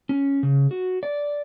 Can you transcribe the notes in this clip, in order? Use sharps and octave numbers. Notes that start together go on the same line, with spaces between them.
C#4
C#3
F#4
D5